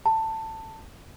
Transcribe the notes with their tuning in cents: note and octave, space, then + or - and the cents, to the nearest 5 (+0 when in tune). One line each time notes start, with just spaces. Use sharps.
A5 +15